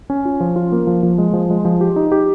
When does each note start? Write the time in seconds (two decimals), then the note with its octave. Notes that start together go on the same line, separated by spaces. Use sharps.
0.10 C#4
0.25 F4
0.40 F3
0.56 F4
0.72 A#3
0.87 F3
1.03 F3
1.18 G#3
1.34 F3
1.50 G#3
1.65 F3
1.81 G4
1.96 D#4
2.12 G4